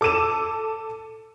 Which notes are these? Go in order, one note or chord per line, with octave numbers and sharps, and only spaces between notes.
A4 D6 E6 D#7 E7